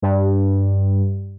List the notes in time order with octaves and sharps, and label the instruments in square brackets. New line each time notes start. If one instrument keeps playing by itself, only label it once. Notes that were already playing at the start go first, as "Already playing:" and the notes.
[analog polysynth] G2